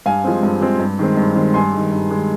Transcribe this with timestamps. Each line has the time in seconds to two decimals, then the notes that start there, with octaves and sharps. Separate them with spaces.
0.06 G2 F5 G#5
0.24 F3 G#3 C4
0.43 G2
0.61 F3 G#3 C4
0.80 G2
0.99 D#3 G#3 C4
1.17 G2
1.35 D#3 G#3 C4
1.54 G2 G#5 C6
1.73 D#3 G#3
1.92 G2
2.11 D#3 G#3